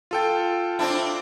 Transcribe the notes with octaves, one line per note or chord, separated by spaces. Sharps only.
F4 A4 G5
C4 D4 E4